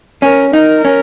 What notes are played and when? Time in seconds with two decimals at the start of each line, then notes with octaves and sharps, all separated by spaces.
0.22 C#4 A#4
0.53 D#4 A#4
0.85 C#4